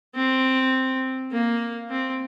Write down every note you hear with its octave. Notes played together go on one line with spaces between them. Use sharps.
C4
A#3
C4